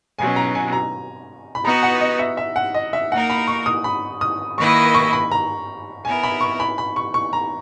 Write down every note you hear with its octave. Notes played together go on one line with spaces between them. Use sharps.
B2 F#3 C#4 G#5
A#5
G#5
A#5
B5
B3 D#4 F#4 B4 A#5
F#5
D#5
E5
E5
F#5
D#5
E5
A#3 D#4 A#4 F#5
B5
C#6
D#6
B5
D#6
D#3 A#3 E4 B4 D#5 C#6
C#6
B5
A#5
B3 E4 A#4 G#5
B5
C#6
B5
B5
C#6
C#6
A#5